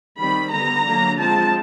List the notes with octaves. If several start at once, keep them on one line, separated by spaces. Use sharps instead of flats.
D#3 G3 C4 B5
D3 G3 B3 A#5
D3 F#3 A#3 D4
F3 G#3 C4 A5